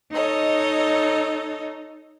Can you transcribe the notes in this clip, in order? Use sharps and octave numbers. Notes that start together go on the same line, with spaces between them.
D#4 A4 C#5 D#5